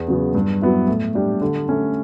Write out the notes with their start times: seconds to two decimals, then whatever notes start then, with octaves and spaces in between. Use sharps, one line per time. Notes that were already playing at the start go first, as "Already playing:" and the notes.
Already playing: E2
0.08 C#3 F#3 B3
0.35 G2
0.62 F#3 B3 E4
0.88 A2
1.15 G3 D4 G4
1.42 D3
1.69 A3 C#4